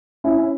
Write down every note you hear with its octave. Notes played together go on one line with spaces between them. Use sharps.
C#4 E4
C#4